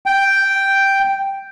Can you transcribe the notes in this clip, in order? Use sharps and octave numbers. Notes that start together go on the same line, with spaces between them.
G5